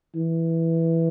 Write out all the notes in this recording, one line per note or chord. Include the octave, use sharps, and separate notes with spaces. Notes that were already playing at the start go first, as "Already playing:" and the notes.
E3